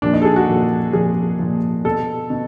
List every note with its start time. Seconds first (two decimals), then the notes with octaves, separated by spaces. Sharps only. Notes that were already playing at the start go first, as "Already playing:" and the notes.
0.02 A#2 F3 D4
0.13 D#4
0.22 A4
0.25 G#4
0.36 F#4
0.48 A#2 F3
0.93 A#2 F3 G#4
1.39 A#2 F3
1.84 B2 A4
2.30 B2